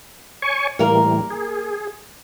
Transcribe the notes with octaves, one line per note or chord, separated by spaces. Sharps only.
C#5 G#5 C#6
A2 E3 G3 A#3 A#4
G#4